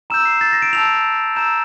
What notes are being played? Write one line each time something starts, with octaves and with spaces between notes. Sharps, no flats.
A#5 E6 G6 E7
C7
A6
A#6
D7
A5 E6 G6 F7
A#5 E6 G6 E7